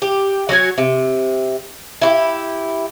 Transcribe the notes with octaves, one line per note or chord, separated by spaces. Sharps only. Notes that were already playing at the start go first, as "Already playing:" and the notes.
G4
F#3 F#4 C#5 G#5
C3
E4 F#4 G4